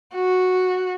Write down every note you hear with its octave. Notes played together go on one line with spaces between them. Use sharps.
F#4